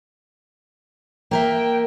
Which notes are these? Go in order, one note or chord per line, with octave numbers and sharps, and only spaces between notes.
A#3 A#4 E5 G5